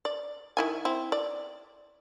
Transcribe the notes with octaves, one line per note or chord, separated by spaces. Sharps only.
D5
D#3 E4 G#5
C4 E4
D5